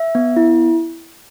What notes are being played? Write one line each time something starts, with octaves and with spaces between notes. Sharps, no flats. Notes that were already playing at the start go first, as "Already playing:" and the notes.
Already playing: E5
B3
E4